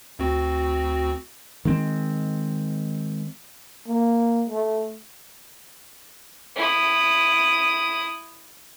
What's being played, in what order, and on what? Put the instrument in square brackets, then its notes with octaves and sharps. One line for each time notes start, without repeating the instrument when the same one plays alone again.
[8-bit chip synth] D2 C4 F#4
[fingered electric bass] D#3 G#3 C4
[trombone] A#3
A3
[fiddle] E4 D#6